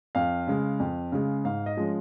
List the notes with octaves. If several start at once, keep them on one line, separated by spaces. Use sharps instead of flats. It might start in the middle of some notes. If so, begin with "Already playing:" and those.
F2 F5
C#3 G#3
F2
C#3 G#3
G#2 F5
D#5
F3 G#3 C#4